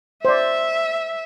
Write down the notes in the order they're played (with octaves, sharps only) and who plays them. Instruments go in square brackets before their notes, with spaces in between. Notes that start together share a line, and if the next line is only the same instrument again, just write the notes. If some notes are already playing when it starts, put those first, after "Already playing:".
[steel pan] C5 D5 [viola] E5